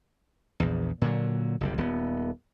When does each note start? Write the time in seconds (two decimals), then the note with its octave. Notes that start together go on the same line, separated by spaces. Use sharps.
0.60 A#1 E2
1.02 A#2 D3 F#3
1.61 F#1 C2 G3
1.78 D#1 B3